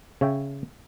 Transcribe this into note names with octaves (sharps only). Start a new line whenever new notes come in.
C#3 C#5 E5 G5